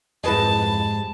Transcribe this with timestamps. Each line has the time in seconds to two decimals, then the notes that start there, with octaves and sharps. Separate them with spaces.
0.24 F2 G#2 E4 G4 B4 D#5 A5